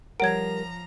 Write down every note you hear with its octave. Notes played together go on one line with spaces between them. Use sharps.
F3 G3 A#4 C#5 F#5 A#5 G#6 D7